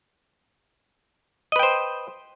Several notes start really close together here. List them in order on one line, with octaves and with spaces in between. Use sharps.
D#5 B4 G5 C5